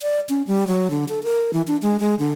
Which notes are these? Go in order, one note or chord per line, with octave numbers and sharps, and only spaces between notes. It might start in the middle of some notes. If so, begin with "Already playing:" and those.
D5
C#4
G3
F#3
D3
A4
A#4
E3
D4
G#3
G#3
D3